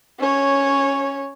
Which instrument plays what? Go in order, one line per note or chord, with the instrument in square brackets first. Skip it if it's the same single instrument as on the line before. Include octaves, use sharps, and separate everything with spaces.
[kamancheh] C#4 C#5